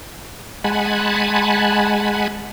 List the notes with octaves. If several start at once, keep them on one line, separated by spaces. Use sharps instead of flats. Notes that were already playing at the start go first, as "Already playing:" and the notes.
G#3 F#5 G#5 A5 B5